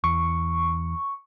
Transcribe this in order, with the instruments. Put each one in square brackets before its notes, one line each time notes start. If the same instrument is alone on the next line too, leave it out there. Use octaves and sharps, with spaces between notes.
[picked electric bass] E2 [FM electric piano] C#6